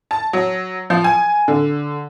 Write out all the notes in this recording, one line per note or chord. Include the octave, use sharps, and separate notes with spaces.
A5
F#3
F3
G#5
D3